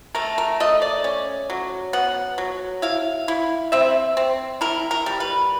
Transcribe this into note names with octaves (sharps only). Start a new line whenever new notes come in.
A3 A#4
A#4
A3 D#5
D5
C#4
F#3
B3 F#5
F#3
E4 F5
E4
C4 E5
C4
E4 A#4
A#4
G3
B4